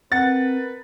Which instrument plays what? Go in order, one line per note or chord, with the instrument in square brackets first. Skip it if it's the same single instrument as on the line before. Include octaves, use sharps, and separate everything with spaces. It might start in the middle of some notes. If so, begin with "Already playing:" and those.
[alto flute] C4 [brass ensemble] A#4 B4 [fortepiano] F#5 [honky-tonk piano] A6